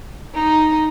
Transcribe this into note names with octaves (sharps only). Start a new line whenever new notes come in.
D#4